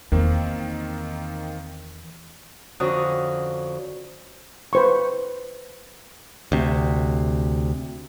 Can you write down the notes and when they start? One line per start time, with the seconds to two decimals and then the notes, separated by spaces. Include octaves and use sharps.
0.12 E2 D#3 A#3 C4
2.80 F2 D3 C#4 F#4 A#5 D#6
4.73 B4 C5 C#6
6.52 D2 C3